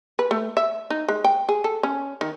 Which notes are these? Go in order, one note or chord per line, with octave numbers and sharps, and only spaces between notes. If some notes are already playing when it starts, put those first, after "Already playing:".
B4
A3
E5
D#4
G#3
G5
G#4
A4
C#4
D#3